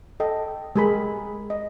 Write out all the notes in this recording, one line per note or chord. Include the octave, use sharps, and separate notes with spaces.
A4 D#5 G5
G#3 G4 G#4 A#4 B5
D#5